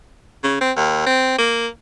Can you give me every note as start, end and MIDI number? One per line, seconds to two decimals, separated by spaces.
0.44 0.59 49
0.61 0.71 60
0.76 1.02 39
1.06 1.36 60
1.38 1.67 58